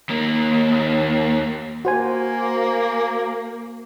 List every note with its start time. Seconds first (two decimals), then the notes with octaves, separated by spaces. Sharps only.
0.09 D#2 A#3
1.85 A#3 F#4 C5 G#5